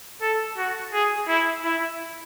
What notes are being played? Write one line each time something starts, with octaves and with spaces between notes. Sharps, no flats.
A4
F#4
G#4
E4
E4